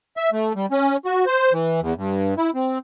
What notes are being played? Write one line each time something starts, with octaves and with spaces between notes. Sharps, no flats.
E5
A3
G3
C#4
F#4
C5
E3
E2
G2
E4
C4